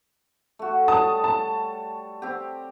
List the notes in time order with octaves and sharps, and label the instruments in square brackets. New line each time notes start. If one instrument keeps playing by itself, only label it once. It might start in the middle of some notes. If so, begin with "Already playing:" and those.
[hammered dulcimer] A3 F#4
[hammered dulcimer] G3 C#5 [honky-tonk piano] A5 D#6
[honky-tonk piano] A5
[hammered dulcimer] C4 G4